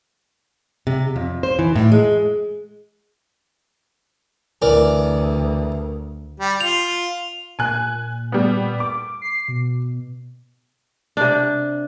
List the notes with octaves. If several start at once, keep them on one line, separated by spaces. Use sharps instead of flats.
C3
F2
C5
E3
A2
G#3
D2 E3 A#4 D5
G3
F4 F7
A#2 G#5 F#6
G3 B3
D6
C7
B2
C3 D4